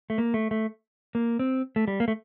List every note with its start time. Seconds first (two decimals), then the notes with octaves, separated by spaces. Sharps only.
0.10 A3
0.18 A#3
0.34 A3
0.51 A3
1.15 A#3
1.39 C4
1.76 A3
1.88 G3
2.00 A#3
2.08 A3